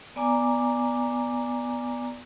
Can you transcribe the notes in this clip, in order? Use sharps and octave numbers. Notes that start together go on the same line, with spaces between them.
B3 D5 G#5 A#5 D6